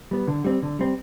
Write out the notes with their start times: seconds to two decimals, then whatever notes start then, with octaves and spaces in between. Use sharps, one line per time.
0.11 G3 B3
0.27 D3
0.44 G3 C4
0.63 D3
0.79 G3 C4